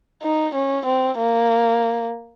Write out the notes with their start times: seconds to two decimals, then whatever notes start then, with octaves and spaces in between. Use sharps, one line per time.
0.23 D#4
0.55 C#4
0.86 C4
1.18 A#3